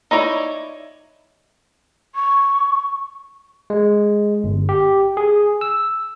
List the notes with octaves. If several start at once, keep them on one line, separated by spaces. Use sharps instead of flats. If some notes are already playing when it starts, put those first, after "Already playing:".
D#4 E4 C#5 D5
C#6
G#3
G1
G4
G#4
E6